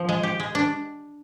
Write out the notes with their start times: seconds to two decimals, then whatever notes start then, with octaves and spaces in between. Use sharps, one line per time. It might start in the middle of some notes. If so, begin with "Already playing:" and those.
Already playing: F3
0.09 G#3
0.23 G4
0.40 G#3
0.55 D4